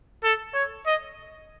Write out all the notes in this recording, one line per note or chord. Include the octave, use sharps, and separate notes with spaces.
A4
C#5
D#5